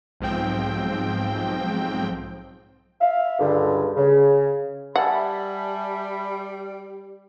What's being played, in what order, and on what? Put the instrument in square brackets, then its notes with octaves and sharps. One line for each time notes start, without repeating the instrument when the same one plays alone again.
[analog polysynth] B1 G#2 F3 C4 G5
[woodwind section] E5 F5
C#2 G2 D3
C#3
[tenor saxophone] G3 [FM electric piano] E5 G#5 A5 [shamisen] F#5 [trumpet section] B5